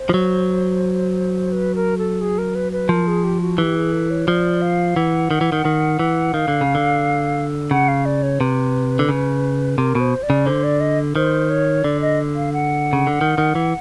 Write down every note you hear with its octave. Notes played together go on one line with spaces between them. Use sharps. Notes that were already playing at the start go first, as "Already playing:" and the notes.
Already playing: C5
F3
F#3
B4
A#4
A4
G#4
A#4
B4
B4
F3 A#4
G#4
G4
F#4
E3 G4
G#4
A4
C#5
F3 D5
F5
E3 F#5
D#3
E3
D#3
D#3
E3
D#3 F5
D3
C#3
D3
C#3 F#5
F5
D5
C#5
C3 B4
D3
C#3
C3 A#4
B2 C5
D5
C#3
D3 C5
D5
D#5
D#3 C5
C#5
D3 D5
D#5
F5
F#5
C#3
D3
D#3
D#3
E3